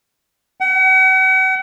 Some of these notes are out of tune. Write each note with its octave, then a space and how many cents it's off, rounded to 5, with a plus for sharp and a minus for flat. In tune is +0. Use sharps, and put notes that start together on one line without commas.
F#5 +40